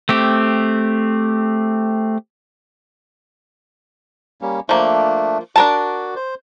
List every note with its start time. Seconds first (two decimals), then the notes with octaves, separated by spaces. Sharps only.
0.09 A3 C4 G4
4.42 G3 A#3 C#4
4.69 F3 A3 A#3 D4
5.56 D4 F#4 A#4 A5
6.16 C5